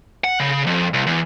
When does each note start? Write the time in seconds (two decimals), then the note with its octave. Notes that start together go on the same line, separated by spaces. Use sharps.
0.24 F#5
0.40 C#3
0.67 F2
0.94 C2
1.06 E2